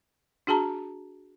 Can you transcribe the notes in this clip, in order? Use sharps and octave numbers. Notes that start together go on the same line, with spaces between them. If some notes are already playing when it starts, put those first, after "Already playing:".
D4 F#4 G#4 A5 A#5